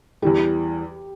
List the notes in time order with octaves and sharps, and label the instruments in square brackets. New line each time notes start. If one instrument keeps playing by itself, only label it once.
[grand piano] E2 E3 G3 [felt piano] G4